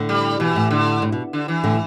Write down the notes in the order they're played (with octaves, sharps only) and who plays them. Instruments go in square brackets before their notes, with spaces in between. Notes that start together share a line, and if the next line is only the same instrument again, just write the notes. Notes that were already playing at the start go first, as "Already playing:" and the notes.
Already playing: [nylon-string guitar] A2 D3
[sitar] G3
[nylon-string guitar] B2 [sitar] E3
[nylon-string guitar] A2
[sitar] D3
[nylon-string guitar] A2
B2
[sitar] D3
E3
[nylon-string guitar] A2 D3